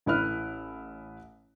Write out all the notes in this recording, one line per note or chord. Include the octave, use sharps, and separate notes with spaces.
A1 E4 B4 F6